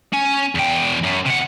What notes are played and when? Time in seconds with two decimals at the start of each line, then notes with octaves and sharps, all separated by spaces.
0.13 C#4
0.55 E2 G5
1.04 F#2
1.26 C3 F#5